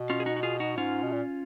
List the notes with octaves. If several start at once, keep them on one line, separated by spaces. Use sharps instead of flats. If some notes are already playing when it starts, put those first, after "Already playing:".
Already playing: B2
C#4 F4
G#4
D#4 F#4
F#4
F4 G#4
D#4 F#4
G#2 C#4 F4
B2
A#2